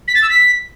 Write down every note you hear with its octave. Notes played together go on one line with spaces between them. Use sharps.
B6
A6
E6
B6